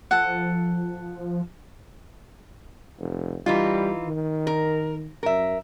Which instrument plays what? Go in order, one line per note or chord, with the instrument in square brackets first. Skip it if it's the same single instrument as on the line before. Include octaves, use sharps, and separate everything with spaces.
[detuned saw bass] F3 [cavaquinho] A4 F#5
[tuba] F1
[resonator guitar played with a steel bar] E3 D#4 F4 [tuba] G3
[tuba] D#3
[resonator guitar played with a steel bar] A#4
[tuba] F#2 [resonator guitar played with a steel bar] A#4 E5